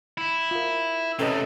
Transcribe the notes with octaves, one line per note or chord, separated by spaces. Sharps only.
E4
F4 A#4
C3 A3 C#4 A4 B4 D#5